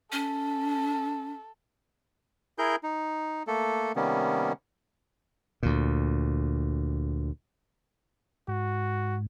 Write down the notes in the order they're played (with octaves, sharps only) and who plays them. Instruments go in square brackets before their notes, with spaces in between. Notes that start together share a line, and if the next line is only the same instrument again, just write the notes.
[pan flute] C#4 [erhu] A4
[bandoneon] E4 G#4 A#4 G6
D#4
A3 A#3 A4
C3 D#3 G3 A#3 B3 C#4
[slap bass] D2 A#2
[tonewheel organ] G#2 [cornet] F#4